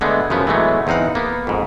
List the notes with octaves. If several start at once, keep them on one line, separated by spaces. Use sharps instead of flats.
D3 G#3 A3 B3
F#2 C#3 F3 B3
E3 F#3 G#3 A3 B3
E2 C4 D#4 F5 F#5
A#3 B3
F2 G#2